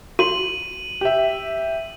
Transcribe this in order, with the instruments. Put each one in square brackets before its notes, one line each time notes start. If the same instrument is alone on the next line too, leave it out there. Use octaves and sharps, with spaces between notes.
[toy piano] F#4 [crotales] D#7 F#7
[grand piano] G4 E5